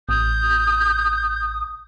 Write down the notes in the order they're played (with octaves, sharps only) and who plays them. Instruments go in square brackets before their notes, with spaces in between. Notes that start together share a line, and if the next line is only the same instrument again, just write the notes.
[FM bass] A1 [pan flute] D#6 [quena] G6